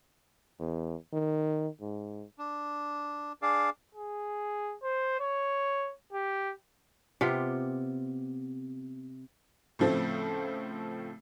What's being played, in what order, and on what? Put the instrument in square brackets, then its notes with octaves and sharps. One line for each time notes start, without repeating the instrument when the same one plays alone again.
[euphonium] E2
D#3
G#2
[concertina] D4
D4 G#4 D5 F5
[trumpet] G#4
C5
C#5
G4
[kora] C3 B3 F4 G4
[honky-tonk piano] A2 C#3 F3 A3 C4